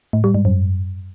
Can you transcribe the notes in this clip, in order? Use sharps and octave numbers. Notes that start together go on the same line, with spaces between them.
A2
G3
G#2
F#2